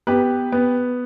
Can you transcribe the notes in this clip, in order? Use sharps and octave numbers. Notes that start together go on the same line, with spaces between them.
B3 G4 B4
B3